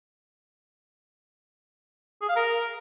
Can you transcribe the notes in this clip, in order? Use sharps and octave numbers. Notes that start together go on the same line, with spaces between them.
G#4
F5
A#4